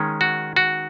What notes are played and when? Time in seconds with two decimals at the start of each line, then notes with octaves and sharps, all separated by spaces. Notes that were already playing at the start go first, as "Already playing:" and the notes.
Already playing: D#3 G#3 C#4
0.21 F#4
0.56 F#4